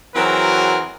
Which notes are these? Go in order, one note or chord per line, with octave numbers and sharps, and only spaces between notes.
E3 F#3 C4 F#4 G#4 A#4